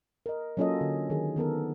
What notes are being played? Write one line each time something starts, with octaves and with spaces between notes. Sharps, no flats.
A#4 D#5
F#3 A#3 C#4 F4 A4 D#5
D3
D#3 G#4
D#3 B3 A4 A#4